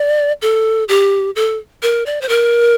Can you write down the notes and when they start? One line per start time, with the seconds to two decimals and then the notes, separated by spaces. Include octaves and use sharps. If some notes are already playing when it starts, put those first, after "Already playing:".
Already playing: D5
0.42 A4
0.89 G4
1.36 A4
1.83 A#4
2.06 D5
2.21 C5
2.29 A#4